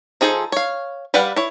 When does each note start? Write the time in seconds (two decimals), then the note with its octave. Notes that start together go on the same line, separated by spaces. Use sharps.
0.21 F3 D#4 G#4 A4 C5
0.52 C#5 F5
1.14 G3 B4 D5 F5 F#5
1.36 E4 C#5